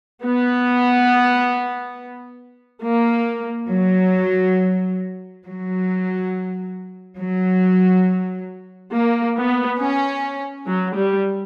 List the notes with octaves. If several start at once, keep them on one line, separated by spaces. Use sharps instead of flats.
B3
A#3
F#3
F#3
F#3
A#3
B3
C#4
F#3
G3